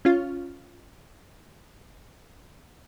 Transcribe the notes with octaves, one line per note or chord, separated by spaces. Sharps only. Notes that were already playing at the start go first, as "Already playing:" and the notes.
C#4 F4